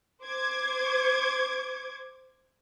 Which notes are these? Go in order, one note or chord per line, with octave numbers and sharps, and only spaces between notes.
C5 D6 G#6